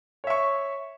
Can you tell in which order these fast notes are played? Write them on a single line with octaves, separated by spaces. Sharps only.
C#5 E5 C#6